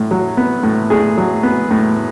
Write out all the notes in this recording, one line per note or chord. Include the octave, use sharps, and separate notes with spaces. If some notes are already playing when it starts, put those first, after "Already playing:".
Already playing: A2
F#3
B3
A2
A2 G#4
F#3
B3
A2